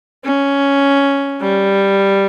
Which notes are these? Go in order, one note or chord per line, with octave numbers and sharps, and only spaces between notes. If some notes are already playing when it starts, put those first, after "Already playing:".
C#4
G3